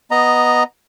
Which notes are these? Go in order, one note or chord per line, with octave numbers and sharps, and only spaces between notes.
B3 D#5 A#5